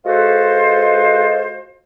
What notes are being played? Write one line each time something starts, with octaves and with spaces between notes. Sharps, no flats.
G#3 F4 F#4 A4 B4 C5